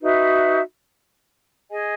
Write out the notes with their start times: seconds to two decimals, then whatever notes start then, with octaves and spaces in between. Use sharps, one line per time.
0.02 D#4 F#4 B4 E5
1.70 G#4 D#5 G#5